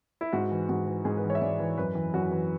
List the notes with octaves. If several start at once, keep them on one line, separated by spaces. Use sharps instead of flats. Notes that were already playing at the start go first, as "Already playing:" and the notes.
E4
G#2 F#4
E3
G#2 F#4
E3
G#2 G#4
B4
E3
C#5
E5
G#2 D5
E3
F#2 B4
E3
F#2 F#4
E3